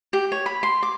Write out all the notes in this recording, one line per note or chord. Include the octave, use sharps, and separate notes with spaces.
G4
C#5
B5
C6
D6